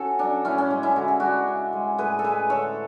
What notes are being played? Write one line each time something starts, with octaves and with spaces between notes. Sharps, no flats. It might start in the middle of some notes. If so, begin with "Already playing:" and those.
Already playing: C#4 F#4 A4
F#3 D4
A2 C#4 E4
C#4
G#3 D4
C#4 E4
D3 F#4
G#4
G#3 D4 F#4
C#3
G#3
A2 G#4 B4
A4
G#3 G#4 B4
D3 A4 C#5